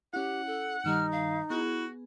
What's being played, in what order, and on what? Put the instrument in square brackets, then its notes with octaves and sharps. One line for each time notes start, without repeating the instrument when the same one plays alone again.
[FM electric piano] C#4 E4 [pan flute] G4 [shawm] F#5
[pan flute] A4
[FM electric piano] G2 D#3 G3 [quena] D#4 [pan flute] F6
[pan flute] F5
[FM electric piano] B3 G#4 [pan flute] E4 [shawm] F#4